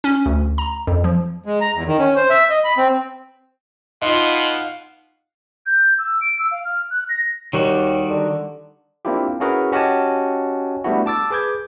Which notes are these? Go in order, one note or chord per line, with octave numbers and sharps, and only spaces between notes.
C#4
D2
A#5
F2
F3
G#3
A#5
E2
D#3
C#4
C5
E5
D#5
B5
C4
B2 D#4 F4 F5 F#5 C6
G6
E6
D7
E6
F5
F6
F#6
A#6
D#2 D#3 G3 F#4
D3
A#3 C4 D4 E4 F4 G4
C#4 E4 F#4 G#4 A#4 B4
C#4 F#4 G4 D#5 G#5 A5
G3 A3 B3 D4 E4 F#4
A5 D6 E6 A6
G#4 B4 D6 G6 G#6